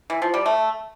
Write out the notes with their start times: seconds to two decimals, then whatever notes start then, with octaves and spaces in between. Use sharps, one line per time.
0.10 E3
0.22 F3
0.34 G3
0.46 A3